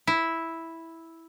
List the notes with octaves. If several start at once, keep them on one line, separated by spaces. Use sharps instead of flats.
E4